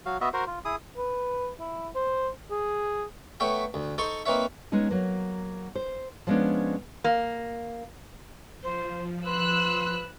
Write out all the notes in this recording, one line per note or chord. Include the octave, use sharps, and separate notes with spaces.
F#3 F#4 F5
B3 F#4 D#5 E5
F#4 A#4 C5
F4
E4 G#4 D#6
B4
E4
C5
G#4
A3 B3 C#5 E5 G5
D2
D#4 A4 C5 A5 C6 C#6
A#3 C4 D#4 B4 C#5 E5
G#3 B3 C#4 D#4
F#3 A#3
C5
F3 G3 G#3 B3 C#4 D4
A#3
F3 C5
B4 C6 E6 F#6